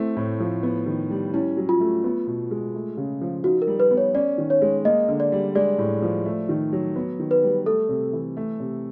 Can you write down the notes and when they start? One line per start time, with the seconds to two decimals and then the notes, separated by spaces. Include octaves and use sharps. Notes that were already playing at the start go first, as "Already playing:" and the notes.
Already playing: A3 C4 E4
0.17 A2
0.40 F3
0.63 B3
0.86 D#3
1.10 G3
1.34 C#4 E4
1.57 F#3
1.69 F4
1.80 A3
2.04 B3
2.27 B2
2.51 G#3
2.75 A3
2.97 C#3
3.21 F3
3.44 D#4 F#4
3.62 A#4
3.67 G3
3.80 B4
3.91 B3
3.97 C#5
4.15 C#4 D5
4.38 D#3
4.50 C#5
4.62 G#3
4.85 A#3 D#5
5.08 D3
5.20 D5
5.32 G3
5.55 G#3 D5
5.78 A2
6.02 F3
6.25 A3
6.49 D#3
6.73 F#3
6.96 B3
7.19 D#3
7.31 B4
7.43 G3
7.66 A3 A4
7.89 C3
8.13 E3
8.37 A3
8.60 C3